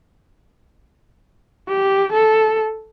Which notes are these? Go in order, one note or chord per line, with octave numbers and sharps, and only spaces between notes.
G4
A4